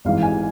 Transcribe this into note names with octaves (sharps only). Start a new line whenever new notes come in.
G#1 G#2 E3 F5
G#5